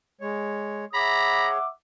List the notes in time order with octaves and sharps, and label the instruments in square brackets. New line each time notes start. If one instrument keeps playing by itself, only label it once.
[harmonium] G#3 C#5
[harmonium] G#4 C#5 [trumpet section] E5 F#5 D6 [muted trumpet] A#5 [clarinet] B5